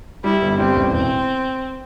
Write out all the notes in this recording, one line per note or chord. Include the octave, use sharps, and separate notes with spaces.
G3 E4
G1
G3 C4
A1
E1 C4